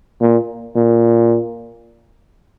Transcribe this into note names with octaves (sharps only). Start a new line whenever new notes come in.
A#2
A#2